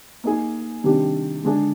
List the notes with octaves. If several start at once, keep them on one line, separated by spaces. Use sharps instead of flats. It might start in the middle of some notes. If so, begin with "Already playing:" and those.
A#3 D#4 G#4
C3 D#3 G3 D4 G4
D3 G#3 D4 G#4